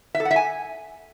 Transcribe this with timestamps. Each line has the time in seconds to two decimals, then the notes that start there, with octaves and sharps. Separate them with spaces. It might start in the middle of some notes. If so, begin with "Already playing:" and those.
0.15 E5
0.20 A4
0.25 F#5
0.31 E5
0.36 G#5